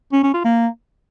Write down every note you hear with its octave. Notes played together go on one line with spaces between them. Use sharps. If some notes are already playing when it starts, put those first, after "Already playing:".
C#4
C#4
F4
A#3